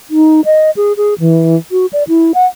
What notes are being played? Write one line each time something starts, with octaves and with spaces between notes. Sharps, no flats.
D#4
D#5
G#4
G#4
E3
F#4
D5
E4
F#5